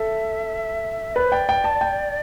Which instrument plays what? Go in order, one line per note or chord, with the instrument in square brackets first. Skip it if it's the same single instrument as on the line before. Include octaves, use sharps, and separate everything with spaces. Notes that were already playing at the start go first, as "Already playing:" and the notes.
Already playing: [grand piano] A4 [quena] E5
[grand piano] B4 [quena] D5
[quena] C5
[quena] D5 [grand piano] G5
[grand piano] G5
A5
G5